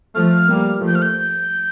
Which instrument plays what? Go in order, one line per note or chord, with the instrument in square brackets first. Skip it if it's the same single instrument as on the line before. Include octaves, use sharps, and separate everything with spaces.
[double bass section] F3 A3 [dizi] F6
[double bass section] G3 A#3
F3 A3
[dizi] G6
F6
G6